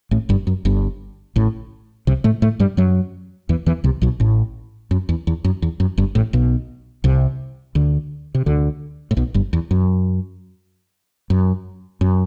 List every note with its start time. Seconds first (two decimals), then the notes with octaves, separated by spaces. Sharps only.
0.11 A1 A2
0.29 G1 G2
0.47 F#2
0.65 G1 G2
1.36 A1 A2
2.07 C2 C3
2.24 A2 A3
2.42 A2 A3
2.60 G2 G3
2.77 F#2 F#3
3.49 E2 E3
3.66 E2 E3
3.84 C2 C3
4.02 B1 B2
4.20 A1 A2
4.91 F#2
5.09 E2
5.27 E2
5.44 F#2
5.62 E2
5.80 F#2
5.98 G1 G2
6.15 A1 A2
6.33 B1 B2
7.04 C2 C3
7.75 D2 D3
8.35 C3
8.46 D2 D3
9.11 A2
9.17 B1 B2
9.34 G1 G2
9.53 E2
9.71 F#2
11.30 F#2
12.01 F#2